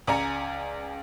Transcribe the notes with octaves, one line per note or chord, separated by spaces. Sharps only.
C#2 D5 G#5 A#5 C#7